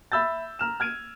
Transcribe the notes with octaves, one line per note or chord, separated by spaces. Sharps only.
E5 B5 E6 G6 A6
A#5 F6 E7
F6 G#6 D7 D#7